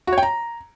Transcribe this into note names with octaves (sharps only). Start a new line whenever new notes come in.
F#4
C#5
G5
A#5